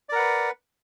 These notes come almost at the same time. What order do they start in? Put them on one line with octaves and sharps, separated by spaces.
D5 A#4 F#5 B4